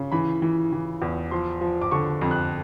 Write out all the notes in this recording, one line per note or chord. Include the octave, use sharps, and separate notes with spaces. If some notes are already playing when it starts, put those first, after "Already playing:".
Already playing: C#3
E3 B5
E3
E3
E2
F3 C6
F3
D6
D3 C#6
F2
F#6